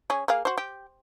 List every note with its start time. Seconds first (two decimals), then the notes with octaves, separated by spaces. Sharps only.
0.10 C#4 G#4
0.28 A#3 G#4 F5
0.45 F#4 C5
0.58 G4